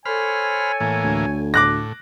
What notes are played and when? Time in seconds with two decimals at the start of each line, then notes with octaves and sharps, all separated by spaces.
0.05 A4 C5 C#5 G#5 B5 F6
0.80 A2 E3 A#3
1.04 D2
1.54 A2 D6 F#6 A#6